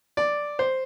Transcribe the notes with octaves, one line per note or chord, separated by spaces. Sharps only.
D5
C5